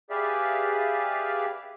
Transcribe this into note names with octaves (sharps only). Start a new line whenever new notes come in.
G4 G#4 B4 D5 E5 F5